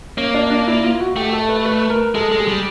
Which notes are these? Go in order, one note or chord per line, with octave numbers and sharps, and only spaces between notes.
A#3 C#4
D4
D4
E4
F4
F#4
A3 G4
A4
B4
B4
A#4
G#3 A4
G#3
G#4
G3